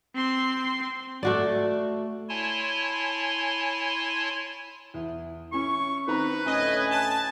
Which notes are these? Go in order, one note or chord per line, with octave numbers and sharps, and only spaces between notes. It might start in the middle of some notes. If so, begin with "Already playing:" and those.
C4 C6
A3 F#4 D5
E4 C#5 G#5 A5 C6
E2
C#4 E4 C#6
D#3 C4 B4 A#5
D2 A2 C#4 D#5 G#5
A5